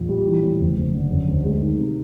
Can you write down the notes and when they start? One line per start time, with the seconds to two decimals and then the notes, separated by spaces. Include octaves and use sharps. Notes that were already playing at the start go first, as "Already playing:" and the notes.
Already playing: A#1
0.09 G3
0.26 E3
0.43 A2
0.60 F#1
0.77 F#1
0.94 D3
1.11 F#2
1.28 D2
1.44 G#3
1.62 D#3
1.78 C3